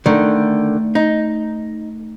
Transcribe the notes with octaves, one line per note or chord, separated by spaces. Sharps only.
D3 D#3 A3
D#4